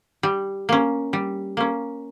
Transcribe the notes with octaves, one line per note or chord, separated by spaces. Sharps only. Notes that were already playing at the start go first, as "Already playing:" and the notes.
G3
A#3 C#4
G3
A#3 C#4